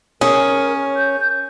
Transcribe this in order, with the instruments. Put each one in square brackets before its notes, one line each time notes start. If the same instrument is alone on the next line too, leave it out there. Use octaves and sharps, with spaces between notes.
[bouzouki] C#4 [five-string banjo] G#4 [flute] A#4
[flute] G6